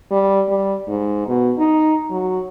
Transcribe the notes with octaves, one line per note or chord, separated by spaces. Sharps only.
G3
G3
G#2
B2
D#4
F#3